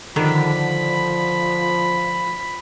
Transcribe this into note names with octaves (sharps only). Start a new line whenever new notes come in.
D3 D#3 F3 B5